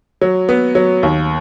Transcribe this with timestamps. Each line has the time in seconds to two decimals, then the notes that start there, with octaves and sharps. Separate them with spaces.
0.21 F#3
0.49 B3
0.75 F#3
1.03 D#2